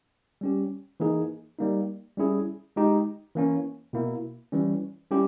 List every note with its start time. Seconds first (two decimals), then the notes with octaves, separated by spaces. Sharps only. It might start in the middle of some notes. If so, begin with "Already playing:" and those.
0.41 G3 C#4 G4
1.00 E3 A#3 D#4 G#4
1.58 G3 A#3 D#4
2.17 G3 C#4 E4 G#4
2.76 G#3 D#4 G4
3.35 E3 A#3 C#4
3.93 B2 A#3 E4
4.52 E3 G3 C#4
5.11 G3 C#4 E4 G4